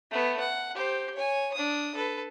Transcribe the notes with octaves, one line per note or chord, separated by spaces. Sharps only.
A3 B3
F#5
G4 C5
C#5 G#5
D4 D#6
A4 B4